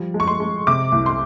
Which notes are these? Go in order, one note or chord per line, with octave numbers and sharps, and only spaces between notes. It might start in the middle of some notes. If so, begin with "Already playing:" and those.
Already playing: F3 G3
G#3
C#6
C6
G#3
C3 D6
C2
C6